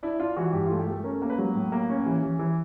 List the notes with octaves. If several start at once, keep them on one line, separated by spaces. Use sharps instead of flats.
D4 E4
D4 F4
E3 F#4
G2 G4
F4
A3
G4
A3 A4
C#4 A#4
A#3
B4
F#3
A2
A#3
C#4
E3
E3
E3